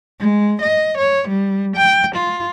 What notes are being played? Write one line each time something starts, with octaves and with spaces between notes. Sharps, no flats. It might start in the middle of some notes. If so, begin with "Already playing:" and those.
G#3
D#5
C#5
G3
G5
F4